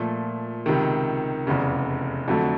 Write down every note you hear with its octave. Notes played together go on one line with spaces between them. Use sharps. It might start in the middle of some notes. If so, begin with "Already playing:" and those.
Already playing: A#2 F3 A3
C#2 C3 D#3
F1 E2 C#3
F2 D3 F#3 A3